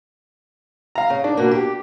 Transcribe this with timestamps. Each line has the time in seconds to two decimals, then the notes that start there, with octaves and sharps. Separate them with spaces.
0.95 F5 A#5
1.10 C#3
1.24 D4 D5
1.37 B2 A#3
1.51 G4